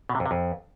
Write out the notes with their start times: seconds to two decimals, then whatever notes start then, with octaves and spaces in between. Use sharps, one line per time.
0.09 B2
0.15 C3
0.20 F2
0.26 C3
0.31 F2